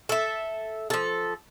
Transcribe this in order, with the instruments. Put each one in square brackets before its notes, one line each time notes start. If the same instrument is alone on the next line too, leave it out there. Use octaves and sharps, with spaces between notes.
[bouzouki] A4 E5
F3 A4